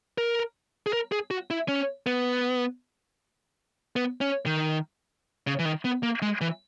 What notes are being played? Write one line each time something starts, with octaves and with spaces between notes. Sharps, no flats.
A#4
G#4
A#4
G#4
F#4
E4
C#4
B3
B3
C#4
D#3
C#3
E3
D#3
B3
A#3
G#3
E3